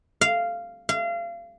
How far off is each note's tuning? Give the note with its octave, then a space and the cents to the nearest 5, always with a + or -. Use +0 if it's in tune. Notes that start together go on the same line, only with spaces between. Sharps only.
F5 -10
F5 -30